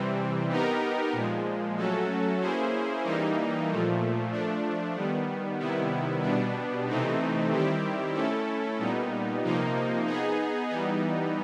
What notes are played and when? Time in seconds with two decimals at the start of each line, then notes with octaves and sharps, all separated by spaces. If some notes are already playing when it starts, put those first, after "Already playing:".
Already playing: C3 E3 G3 C4
0.49 B3 D#4 G4 A#4
1.13 A#2 F3 G#3
1.77 F#3 A3 C#4 F#4 A4
2.40 A#3 C#4 E4 G#4 C5
3.04 E3 G3 A#3 D#4
3.68 A#2 F3 A3
4.32 F3 A3 D4
4.96 D#3 G3 B3
5.60 C3 D#3 G3 B3 E4
6.23 B2 G3 B3 D4
6.87 C3 E3 A3 C4 D#4
7.51 D#3 G3 C4 E4 G4
8.14 A3 C#4 E4 A4
8.79 A#2 G3 B3 D#4
9.42 C3 F3 A#3 D#4
10.07 B3 D#4 G#4
10.70 E3 G3 B3 D#4